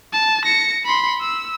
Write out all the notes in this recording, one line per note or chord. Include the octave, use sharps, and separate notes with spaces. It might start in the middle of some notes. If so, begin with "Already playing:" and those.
A5
A#6 C#7
B5 C6
E6